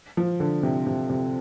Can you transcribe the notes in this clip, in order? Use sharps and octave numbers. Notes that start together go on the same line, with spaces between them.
F3
D3
C3
C3
C3